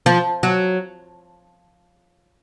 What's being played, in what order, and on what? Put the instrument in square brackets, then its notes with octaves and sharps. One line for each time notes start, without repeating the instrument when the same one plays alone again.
[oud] F3
F#3